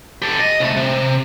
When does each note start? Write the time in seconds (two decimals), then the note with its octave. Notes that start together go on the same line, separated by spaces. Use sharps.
0.22 G4 A4
0.39 D#5
0.60 C2 A3
0.77 C3